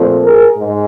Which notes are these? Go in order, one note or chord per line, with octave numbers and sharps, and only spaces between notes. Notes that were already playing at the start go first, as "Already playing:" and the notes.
Already playing: A#2 F3 A3 C4
G#4 A#4
G#2